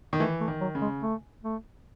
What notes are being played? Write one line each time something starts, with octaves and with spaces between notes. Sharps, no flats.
D#3
E3 A3
A3
D#3
F#3
C#3
G#3
A3
A3